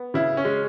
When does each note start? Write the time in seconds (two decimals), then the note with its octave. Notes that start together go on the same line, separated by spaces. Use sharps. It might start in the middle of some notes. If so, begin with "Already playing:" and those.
Already playing: B3
0.14 C#3 E4
0.37 C#4
0.45 G#3